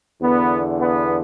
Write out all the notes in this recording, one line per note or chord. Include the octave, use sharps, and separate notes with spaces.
E2 D3 B3
B3